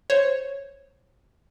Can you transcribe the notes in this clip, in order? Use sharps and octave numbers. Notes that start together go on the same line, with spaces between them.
C5 C#5